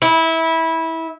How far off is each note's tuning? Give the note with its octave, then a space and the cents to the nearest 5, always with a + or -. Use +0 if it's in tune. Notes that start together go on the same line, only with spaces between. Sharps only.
E4 -20